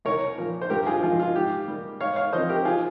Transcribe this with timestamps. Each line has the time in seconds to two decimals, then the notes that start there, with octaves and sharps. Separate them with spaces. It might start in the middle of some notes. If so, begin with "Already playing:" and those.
0.05 C2 A#4 C#5
0.38 A#2 F3 A#3
0.61 C5
0.70 G2 G4 A#4
0.86 F4 G#4
1.03 F3 G#3 D#4 F4
1.19 F4
1.35 G#2 G4
1.68 G3 A#3
2.00 G#2 C#5 F5
2.16 C#5 F5
2.33 F3 C4 C5 D#5
2.49 G4 A#4
2.65 F4 G#4